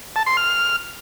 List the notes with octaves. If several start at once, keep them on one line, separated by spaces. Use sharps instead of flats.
A5
C6
F6